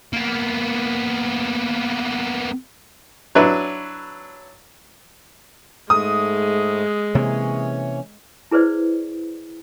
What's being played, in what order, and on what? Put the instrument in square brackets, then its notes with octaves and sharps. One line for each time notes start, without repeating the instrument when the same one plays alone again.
[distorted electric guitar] A#3 B3
[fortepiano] F#3 D4 E4 B4
[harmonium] G#2 A3 [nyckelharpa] G#3 [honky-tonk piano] D#6
[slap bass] C3 A#3 [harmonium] E3 C#4 C#5
[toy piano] E4 G#4 B4 C5 D5